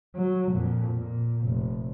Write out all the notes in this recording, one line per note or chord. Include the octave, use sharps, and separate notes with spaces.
F#3
F2 A#2
A#2
F1